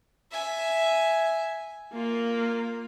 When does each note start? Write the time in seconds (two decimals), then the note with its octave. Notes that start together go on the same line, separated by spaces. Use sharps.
0.32 E5 G#5
1.94 A#3 F4